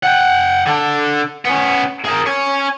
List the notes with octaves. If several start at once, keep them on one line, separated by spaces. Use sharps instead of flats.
F#5 G5
D3 D4
B3 C#4
G#4 A#4
C#5 G#5